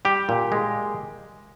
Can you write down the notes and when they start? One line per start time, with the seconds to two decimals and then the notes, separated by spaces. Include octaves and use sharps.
0.05 G3 G4
0.29 A#2
0.52 G#3